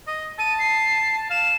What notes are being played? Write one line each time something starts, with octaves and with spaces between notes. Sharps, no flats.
D#5
A5 D#7
C7
F5 E7